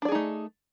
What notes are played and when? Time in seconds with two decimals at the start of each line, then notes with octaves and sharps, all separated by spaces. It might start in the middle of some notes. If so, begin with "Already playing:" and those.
0.02 D4
0.05 D5
0.08 G#4
0.12 D#4
0.15 A3